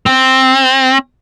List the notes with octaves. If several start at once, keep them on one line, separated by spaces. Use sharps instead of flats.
C4